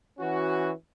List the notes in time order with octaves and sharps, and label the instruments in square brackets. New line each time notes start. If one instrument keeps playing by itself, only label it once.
[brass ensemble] E3 C#4 F#4